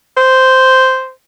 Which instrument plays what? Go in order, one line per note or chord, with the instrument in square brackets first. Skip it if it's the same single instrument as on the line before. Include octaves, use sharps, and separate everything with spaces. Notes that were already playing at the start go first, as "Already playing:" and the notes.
[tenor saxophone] C5